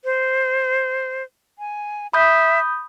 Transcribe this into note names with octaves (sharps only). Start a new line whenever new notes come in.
C5
G#5
E5 B5 D#6 G6